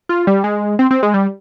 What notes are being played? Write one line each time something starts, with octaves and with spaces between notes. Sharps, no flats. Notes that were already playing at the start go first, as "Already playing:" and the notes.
F4
G3
G#3
C4
C4
G#3
G3